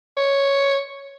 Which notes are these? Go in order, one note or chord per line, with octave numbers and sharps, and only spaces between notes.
C#5